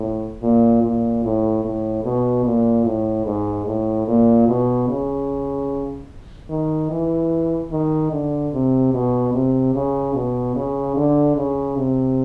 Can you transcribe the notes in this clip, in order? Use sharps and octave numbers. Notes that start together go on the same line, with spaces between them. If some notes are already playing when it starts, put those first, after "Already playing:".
Already playing: A2
A#2
A#2
A2
A2
B2
A#2
A2
G#2
A2
A#2
B2
C#3
D#3
E3
D#3
D3
C3
B2
C3
C#3
B2
C#3
D3
C#3
C3